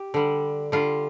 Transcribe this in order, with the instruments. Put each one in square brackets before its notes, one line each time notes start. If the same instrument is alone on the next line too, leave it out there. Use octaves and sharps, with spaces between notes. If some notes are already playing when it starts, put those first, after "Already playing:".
Already playing: [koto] G4
D3 G3
D3 G3 F4